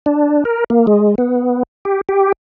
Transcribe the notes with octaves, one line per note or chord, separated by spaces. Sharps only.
D4
A#4
A#3
G#3
B3
G4
G4